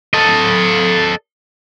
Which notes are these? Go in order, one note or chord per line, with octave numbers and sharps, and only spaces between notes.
A4 D#5